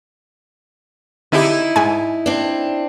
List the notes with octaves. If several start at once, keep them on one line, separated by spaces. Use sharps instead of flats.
D3 D#4 E4 G4
G#2 G#5
C4 D4